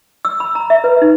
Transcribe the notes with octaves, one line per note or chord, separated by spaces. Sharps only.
E6
B5
A#5
E5
B4
D#4